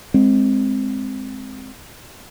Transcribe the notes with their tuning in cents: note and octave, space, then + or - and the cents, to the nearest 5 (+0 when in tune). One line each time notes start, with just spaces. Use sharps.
G#3 +0 C4 +0